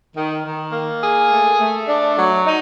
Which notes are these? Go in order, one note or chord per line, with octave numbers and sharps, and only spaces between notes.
D#3
D#3
A#3
G#4
A3
A3
D4
F#3
D#4